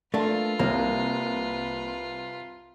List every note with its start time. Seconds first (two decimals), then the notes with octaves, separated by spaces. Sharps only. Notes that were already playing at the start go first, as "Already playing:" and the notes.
0.14 A3 A#3 D4 F4 B4
0.59 C2 A#3